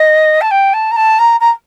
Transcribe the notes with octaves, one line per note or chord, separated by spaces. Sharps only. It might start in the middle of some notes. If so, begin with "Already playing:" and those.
Already playing: D#5
A5
G5
A5
A#5
A5
A#5
A#5